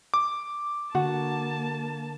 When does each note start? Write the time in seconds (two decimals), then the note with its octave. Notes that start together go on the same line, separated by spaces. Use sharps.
0.14 D6
0.95 D3 A#3 F#4 A5